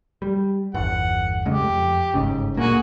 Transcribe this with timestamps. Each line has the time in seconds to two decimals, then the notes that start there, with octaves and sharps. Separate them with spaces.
0.22 G3
0.74 G1 E2 F#5
1.45 C#3 G#3 A3 G4
1.62 F2
2.14 G1 G#2 C#3
2.57 D2 A#2 A#3 F#4 G#4